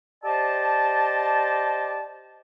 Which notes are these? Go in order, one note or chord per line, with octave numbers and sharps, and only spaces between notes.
G4 C5 D5 D#5 A5